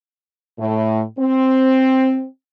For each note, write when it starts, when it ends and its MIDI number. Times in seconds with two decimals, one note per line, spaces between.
0.59 1.02 45
1.19 2.26 60